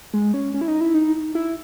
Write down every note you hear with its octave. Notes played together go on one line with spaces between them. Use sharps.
G#3
C#4
C#4
E4
D#4
E4
D#4
E4